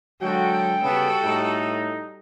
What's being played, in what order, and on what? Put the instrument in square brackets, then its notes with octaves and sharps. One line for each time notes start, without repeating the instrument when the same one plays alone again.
[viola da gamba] D3 G#3 A4 [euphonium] F#3 [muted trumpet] F#4 [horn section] G5
[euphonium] C#3 [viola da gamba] G3 F#4 A4 [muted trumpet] B3
[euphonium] A2 [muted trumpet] D#4